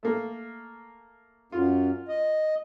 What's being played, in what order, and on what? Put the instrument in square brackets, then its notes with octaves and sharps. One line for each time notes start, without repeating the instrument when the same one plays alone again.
[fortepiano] A3 A#3
[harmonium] F#2 [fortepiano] F4
[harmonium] D#5